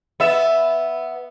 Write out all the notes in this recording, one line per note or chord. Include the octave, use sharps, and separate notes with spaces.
B3 E5